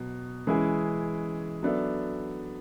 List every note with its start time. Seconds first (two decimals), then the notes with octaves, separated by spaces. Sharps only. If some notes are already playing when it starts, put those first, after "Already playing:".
Already playing: B2 F#3
0.47 E3 G#3 C#4 E4 G#4
1.63 F#3 B3 D4 A4 E5